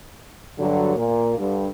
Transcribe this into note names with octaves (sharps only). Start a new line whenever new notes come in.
G2 D3 F#3
A#2 A#3
G2 D3